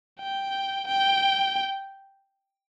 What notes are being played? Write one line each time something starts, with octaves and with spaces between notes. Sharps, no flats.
G5
G5